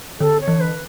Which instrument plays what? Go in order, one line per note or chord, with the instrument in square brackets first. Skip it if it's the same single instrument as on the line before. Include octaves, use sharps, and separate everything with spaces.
[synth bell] D3 [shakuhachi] A4
[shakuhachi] C#5
[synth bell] E3
[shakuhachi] B4